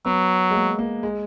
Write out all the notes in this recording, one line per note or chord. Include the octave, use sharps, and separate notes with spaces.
F#3 B3
G#3
A#3
A#3
G#3